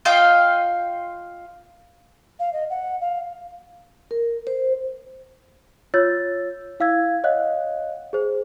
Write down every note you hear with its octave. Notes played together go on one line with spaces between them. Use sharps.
F4 D#5 F5 G5
F5
D#5
F#5
F5
A#4
C5
F4 C#5 E6 G6 A6
E4 F5 E6 G#6
C#5 D#5 F5 F#5 F#6
G#4 C5